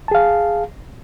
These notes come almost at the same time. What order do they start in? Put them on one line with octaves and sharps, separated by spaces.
A5 G#4 F5